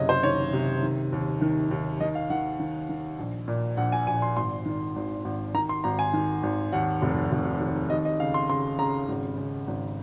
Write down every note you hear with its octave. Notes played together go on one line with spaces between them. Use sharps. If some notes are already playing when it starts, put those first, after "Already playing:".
Already playing: F#1 C3 C#5 D#5
C5
D#3 C#5
C3
D#3
D#2
D#3
D#2
D#3 D#5
F5
D#3 F#5
D#3
D#3
A#1
A#2
A#1 F#5
G#5
A#1 G#5
C6
G#1 C6
D#3
G#1
G#1
D#3 A#5
C6
G#1 A#5
G#5
D#3
G#1
D#2 F#5
F1
F1
D#2
D#2 D#5
D#5
C#3 F5
C6
C#3 C6
C#3 A#5
G#1
C#3
G#1